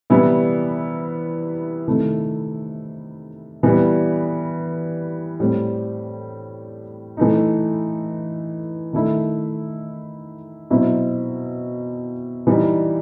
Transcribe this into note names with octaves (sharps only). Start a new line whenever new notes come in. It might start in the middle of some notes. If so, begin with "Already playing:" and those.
C3 E3 G3 B3 E4
C3 D#3 A3 E4
E3 G3 B3
A2 G3 C4
E3 A3 D#4
D#3 A3 E4
B2 F#3 C4 E4
E3 G3 D#4